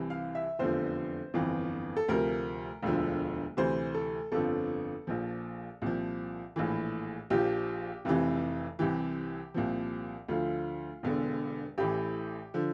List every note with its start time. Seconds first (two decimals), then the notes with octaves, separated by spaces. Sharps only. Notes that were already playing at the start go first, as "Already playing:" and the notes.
Already playing: C2 C3 E3
0.10 F5
0.35 E5
0.59 F1 E2 D3 F3 C5
1.34 G1 F2 E3
1.97 A4
2.08 D2 C3 F3 A#4
2.83 E1 D2 D3 F3
3.57 D2 C3 E3 C5
3.94 A4
4.32 G1 F2 D3 F3 A4
5.07 A#1 A#2 F3
5.82 C2 A#2 F3
6.56 A#1 A2 E3
7.30 A#1 A#2 F3 G4
8.05 F1 F2 C3 E3
8.79 C2 C3 E3 G4
9.54 C2 A#2 F3
10.28 D2 D3 F3 F4
11.03 E1 E2 D3
11.78 A1 A2 E3 G4
12.54 D3 F3